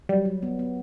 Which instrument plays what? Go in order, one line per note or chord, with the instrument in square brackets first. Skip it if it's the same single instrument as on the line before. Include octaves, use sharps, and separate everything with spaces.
[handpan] F#3 [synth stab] G3
[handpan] F#3
B3
B3